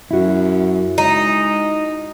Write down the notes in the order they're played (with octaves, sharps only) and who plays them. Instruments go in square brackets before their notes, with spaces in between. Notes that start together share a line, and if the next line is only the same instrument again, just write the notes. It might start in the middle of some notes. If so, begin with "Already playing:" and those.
[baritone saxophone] F#2 [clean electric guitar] E4 F#4
[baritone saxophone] G#3 [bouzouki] D#4